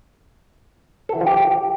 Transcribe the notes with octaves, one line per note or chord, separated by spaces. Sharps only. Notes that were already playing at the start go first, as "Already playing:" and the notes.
A4
E3
F3
G4